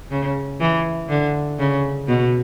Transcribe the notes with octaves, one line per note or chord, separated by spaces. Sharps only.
C#3
E3
D3
C#3
B2